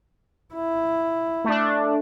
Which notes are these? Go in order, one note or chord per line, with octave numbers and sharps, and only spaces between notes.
E4
A3 D4